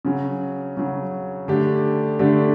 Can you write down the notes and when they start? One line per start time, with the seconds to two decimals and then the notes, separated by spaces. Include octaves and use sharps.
0.05 C#3 F#3 C#4
0.77 C#3 F#3 C#4
1.48 D3 A3 D4 G4
2.19 D3 A3 D4 G4